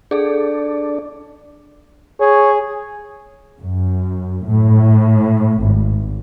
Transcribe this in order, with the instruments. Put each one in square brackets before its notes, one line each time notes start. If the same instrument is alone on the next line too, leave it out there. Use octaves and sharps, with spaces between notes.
[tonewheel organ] D4 [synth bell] G#4 A4
[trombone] G#4 [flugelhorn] C#5
[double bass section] F#2
A2
G#1